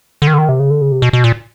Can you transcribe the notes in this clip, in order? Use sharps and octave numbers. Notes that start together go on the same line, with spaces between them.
D3
D#3
D3
D#3
C3
C#3
D3
C#3
C3
B2
B2
A#2